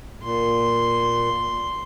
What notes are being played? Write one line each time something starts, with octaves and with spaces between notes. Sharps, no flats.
A#2 C6